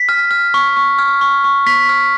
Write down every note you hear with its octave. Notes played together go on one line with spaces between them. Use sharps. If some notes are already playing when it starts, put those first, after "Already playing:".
Already playing: B6
F6
F6
C#6
C#6
F6
C#6
C#6
C#6 B6
F6